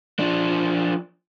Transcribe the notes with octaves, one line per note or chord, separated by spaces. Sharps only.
F3 D4